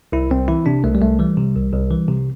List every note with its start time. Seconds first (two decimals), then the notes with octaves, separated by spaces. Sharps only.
0.12 C2 E4
0.31 C2 C4
0.48 E3 E4
0.66 C3 D4
0.84 C2 A3
0.95 G3
1.01 C2 A3
1.19 E3 G3
1.37 C3
1.55 C2
1.72 C2
1.91 E3
2.09 C3